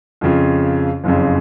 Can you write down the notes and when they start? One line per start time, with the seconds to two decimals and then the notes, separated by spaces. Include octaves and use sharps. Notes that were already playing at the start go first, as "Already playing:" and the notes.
0.21 F2 C#3 F3
1.04 F#1 F2 C#3